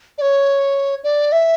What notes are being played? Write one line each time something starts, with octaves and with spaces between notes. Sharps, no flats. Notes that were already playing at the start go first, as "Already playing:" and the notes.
D5
C#5
D5
E5